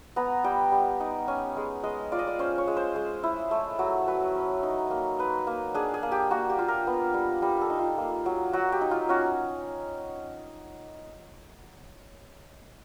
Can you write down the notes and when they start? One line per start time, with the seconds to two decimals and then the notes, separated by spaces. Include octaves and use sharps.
0.16 B3 A#5
0.44 G3 G5
0.72 G3
1.00 D#4
1.28 C#4 G#5
1.57 G#3
1.84 G#3 D#5
2.12 F4 D5
2.19 D#5
2.27 D5
2.39 C#4 C5
2.58 C#5
2.68 G#3
2.77 C5
2.96 G#3
3.23 E4
3.51 A3
3.79 F#3
4.08 F#3 B4
4.35 C#4
4.63 D#4
4.91 A#3
5.19 D#4 B4
5.47 A#3
5.74 D4 G#4
5.94 G#4
6.03 A#3
6.12 G4
6.31 A#3 F#4
6.49 G4
6.59 F4
6.68 A#4
6.87 B3
7.14 G3
7.42 G3 A#4
7.61 A4
7.70 D#4
7.79 F4
7.98 A#3
8.26 F#3
8.53 F#3 F#4
8.72 G4
8.81 D#4
8.91 F4
9.09 C#4 F#4